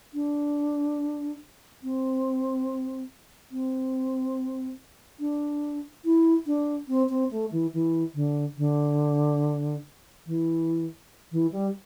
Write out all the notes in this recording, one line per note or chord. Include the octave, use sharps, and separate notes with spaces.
D4
C4
C4
D4
E4
D4
C4
C4
A3
E3
E3
D3
D3
E3
E3
G3